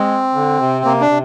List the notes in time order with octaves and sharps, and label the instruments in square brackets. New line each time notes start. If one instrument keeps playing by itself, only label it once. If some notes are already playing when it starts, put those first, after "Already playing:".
Already playing: [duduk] G#3 [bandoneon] C4
[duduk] D3
C3
[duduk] C3 [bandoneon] A#3
[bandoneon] D4
[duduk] C3